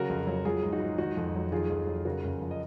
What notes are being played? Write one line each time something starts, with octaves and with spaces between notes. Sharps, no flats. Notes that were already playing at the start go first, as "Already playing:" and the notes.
Already playing: C#3 F#3 F#4 A#4
F2
F#3
F#3 F4 G#4
G#2
D#4 F#4
G#2
D#3 D#4 F#4
F2
F#3
D#3 F4 G#4
F2
F#3
C#3 F#4 A#4
F#2
F3
D#5